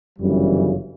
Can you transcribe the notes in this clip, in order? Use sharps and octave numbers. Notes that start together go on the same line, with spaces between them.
G1 F#2 C#3 E3 G3